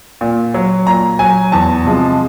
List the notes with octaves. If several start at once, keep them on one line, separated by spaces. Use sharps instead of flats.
A#2
F#3
A#2 A#5
F#3 G#5
E2 A5
C3 F3 G#3